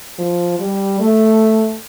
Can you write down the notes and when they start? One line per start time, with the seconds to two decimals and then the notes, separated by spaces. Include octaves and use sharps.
0.19 F3
0.60 G3
1.00 A3